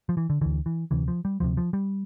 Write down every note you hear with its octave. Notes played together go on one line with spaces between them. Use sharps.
F3
E3
D3
D2 D3 E3
E3
D2 C3 E3
F3
G3
D2 C3 F3
F3
G3